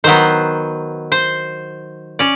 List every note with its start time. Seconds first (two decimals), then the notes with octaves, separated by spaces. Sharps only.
0.04 D#3 F#3 B3 C5
1.12 C5
2.19 C#4 D5